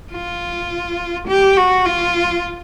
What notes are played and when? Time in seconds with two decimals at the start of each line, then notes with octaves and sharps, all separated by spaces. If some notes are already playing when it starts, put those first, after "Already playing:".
0.12 F4
1.28 G4
1.57 F#4
1.85 F4